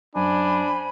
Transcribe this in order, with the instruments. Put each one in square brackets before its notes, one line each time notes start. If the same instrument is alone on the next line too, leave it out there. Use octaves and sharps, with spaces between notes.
[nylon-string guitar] F#2 [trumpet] D4 [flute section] C5 G#5 B5